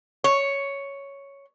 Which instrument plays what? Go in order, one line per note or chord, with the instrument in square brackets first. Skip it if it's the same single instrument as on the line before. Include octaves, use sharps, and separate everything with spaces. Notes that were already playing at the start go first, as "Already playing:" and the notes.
[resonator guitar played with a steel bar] C#5